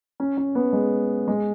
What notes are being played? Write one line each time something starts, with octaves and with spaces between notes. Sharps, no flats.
C#4
C#4
B3
G#3
G#3